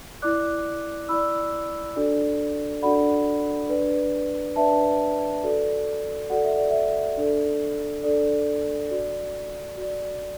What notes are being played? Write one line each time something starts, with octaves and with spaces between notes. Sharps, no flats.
E4 D5 D6 F#6
E4 D5 B5 E6
D4 F#4 A4 D5
D4 F#4 A4 D5 F#5 B5
D4 B4 D5
D4 B4 D5 E5 A5
F#4 A4 D5
F#4 A4 D5 F#5
E5
D5
E5
D4 A4 D5
D4 A4 D5
F#4 D5
F#4 D5